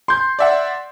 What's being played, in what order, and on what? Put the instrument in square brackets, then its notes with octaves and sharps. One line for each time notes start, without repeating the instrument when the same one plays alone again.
[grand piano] C6 G6
[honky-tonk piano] D5 E5 F#5